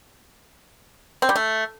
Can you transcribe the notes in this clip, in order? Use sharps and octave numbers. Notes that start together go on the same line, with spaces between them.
C4
G3
A3